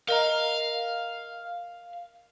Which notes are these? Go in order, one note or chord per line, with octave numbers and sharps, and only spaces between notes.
A#4 D#5 F5 A#5